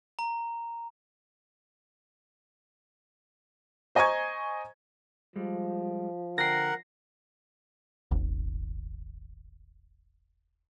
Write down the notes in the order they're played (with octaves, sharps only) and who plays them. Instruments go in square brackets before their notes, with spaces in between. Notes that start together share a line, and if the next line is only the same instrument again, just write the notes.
[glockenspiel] A#5
[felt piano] C5 D#5 G#5 A#5 C#6 G#6
[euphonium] F3 [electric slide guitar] G3 G#3
[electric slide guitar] D3 G5 [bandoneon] A#4 F#5 [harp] A#6 C7
[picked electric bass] D#1 G#1